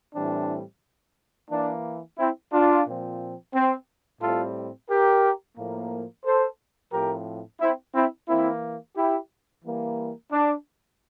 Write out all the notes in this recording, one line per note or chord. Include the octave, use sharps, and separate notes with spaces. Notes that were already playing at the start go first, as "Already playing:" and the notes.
A2 E3 G3 C4 D4
E3 A#3 D4
C4 E4
D4 F4
A#2 F3 C4
C4
A2 G3 C4 F4 A4
G4 A#4
A2 F3 A#3
A4 C5
A2 F3 C4 G4 A#4
C4 E4
C4 E4
E3 A#3 C4 E4
E4 G4
E3 G3 A#3
D4